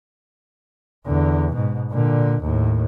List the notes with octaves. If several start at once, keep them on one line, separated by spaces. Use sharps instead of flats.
E2 D3
G#2 B2
A#2 D3
D#2 A2